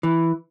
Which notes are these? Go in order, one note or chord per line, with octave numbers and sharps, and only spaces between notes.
E3